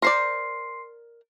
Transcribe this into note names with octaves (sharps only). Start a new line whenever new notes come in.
A#4 C5 D5 C6 C7